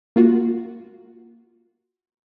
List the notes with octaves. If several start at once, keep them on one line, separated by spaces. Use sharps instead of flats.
A#3 F4 F#4